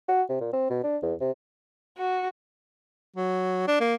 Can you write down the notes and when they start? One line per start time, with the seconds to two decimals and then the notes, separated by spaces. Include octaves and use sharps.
0.08 F#4
0.29 C3
0.40 A#2
0.53 C4
0.70 B2
0.84 D4
1.02 E2
1.21 C3
1.96 F#4
3.16 F#3
3.68 D4
3.80 A#3